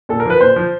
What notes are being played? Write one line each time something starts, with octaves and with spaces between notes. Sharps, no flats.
A#2 A4
A#4
F3 B4
A#2 C5
F3